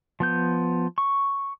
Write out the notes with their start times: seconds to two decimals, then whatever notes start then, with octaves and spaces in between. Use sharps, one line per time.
0.20 F3 B3 G6
0.98 C#6